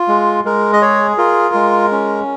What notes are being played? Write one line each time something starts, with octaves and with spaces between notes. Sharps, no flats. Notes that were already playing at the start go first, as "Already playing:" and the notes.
Already playing: F4
G#3
G#3 A#4
D#5
G#4 C#5
F4 A#4
G#3
C#4